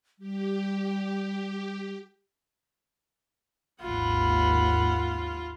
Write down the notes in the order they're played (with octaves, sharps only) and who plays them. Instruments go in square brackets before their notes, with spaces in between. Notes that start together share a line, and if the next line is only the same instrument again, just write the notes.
[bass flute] G3 [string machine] G4
[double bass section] G#1 D#2 [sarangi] F4 [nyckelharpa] F#5 B5